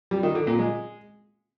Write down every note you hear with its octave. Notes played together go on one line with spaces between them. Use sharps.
G3
D#3
D3
A#2
G#3